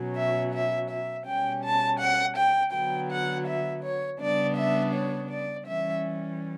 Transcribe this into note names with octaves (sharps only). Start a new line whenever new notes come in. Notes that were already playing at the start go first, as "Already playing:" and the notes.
Already playing: B2 F#3 C#4
E5
E5
E5
B2 G3 C#4 G5
A5
F#5
G5
D3 F#3 B3 G5
F#5
E5
C#5
C#3 G3 B3 D4 D5
E5
C#5
D5
E3 G3 C#4 E5